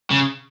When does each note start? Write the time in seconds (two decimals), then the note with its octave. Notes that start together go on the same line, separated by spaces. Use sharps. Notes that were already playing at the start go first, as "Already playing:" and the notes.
0.11 C#3